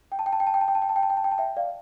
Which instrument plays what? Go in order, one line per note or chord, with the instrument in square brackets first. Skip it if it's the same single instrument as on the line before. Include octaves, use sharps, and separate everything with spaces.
[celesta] G5
A5
G5
A5
G5
A5
G5
A5
G5
A5
G5
A5
G5
A5
G5
A5
G5
A5
E5 G5
D5 F5